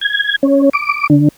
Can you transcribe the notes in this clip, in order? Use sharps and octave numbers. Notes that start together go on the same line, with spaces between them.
G#6
C#4
D6
D3